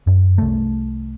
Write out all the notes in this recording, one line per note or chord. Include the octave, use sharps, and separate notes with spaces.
F#2
C2 A3